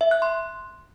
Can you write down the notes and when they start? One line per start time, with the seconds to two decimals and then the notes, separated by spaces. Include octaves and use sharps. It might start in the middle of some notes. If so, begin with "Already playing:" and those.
0.01 E5
0.11 F#6
0.22 C6